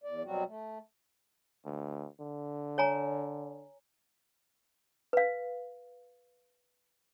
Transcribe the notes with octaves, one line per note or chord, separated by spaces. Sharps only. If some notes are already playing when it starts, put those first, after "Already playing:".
E2 D5
B2 F#3 G3 C4 F#4
A3
D2
D3
C#5 G#5 A#5
B4 F5